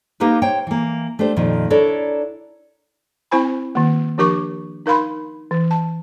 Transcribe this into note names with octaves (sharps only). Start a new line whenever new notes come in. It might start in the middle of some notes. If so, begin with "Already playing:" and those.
A#3 D#4 G4 A#4 B4
C5 C#5 G5
E3 A#3
A3 D4 G4 C5
F2 A#2 D#3 F3
D4 E4 A4 A#4 C#5 D5
C4 E4 C5 G#5 B5
D#3 A#3
F3 D4 G4 A#4 C#6 D6
D#4 A#4 F5 B5 C6
E3
A5